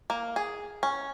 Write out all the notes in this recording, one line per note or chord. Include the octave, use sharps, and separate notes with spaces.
A#3
G#4
C#4